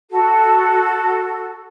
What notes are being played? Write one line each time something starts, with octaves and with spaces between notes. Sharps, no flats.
F#4 A4